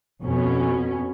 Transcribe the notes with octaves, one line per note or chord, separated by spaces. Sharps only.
F2 B2 C#4